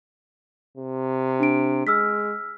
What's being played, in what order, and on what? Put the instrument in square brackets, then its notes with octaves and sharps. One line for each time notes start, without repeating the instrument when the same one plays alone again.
[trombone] C3
[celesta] D4 D7
[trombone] G#3 [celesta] E6 F6 B6